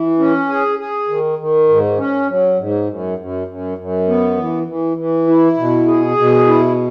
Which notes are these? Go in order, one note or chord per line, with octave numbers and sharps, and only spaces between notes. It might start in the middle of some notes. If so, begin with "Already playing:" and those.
Already playing: E3
C#4
G#4
G#4
D#3
D#3
G#2
C#4
F#3
G#2
F#2
F#2
F#2
F#2
B3
E3
E3
E3
E4
B2
G#4
B2
E4